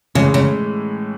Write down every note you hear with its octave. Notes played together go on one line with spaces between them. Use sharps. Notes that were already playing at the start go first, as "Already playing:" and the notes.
A2 C#3 E3 G#3 C#4
C#3